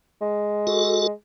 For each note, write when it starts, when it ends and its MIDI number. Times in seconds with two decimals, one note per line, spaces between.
0.21 1.11 56
0.67 1.07 66
0.67 1.07 69